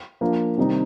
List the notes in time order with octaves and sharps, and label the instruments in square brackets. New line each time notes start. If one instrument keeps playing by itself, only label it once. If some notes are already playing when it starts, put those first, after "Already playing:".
[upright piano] F3 A#3 D4 F4
C3 D#3 G3 C4 D#4